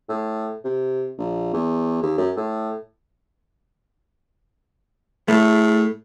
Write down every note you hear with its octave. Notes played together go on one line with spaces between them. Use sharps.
A2
C3
A#1
E2
D#2
F#2
A2
A2 A3 G#4